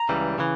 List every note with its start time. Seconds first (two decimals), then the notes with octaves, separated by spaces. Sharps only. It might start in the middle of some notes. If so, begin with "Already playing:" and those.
Already playing: A#5
0.09 C#2 C#3 E3 G3
0.38 C#3 E3